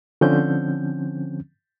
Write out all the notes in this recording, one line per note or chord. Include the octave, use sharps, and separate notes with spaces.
D3 F3 C4 C#4 G6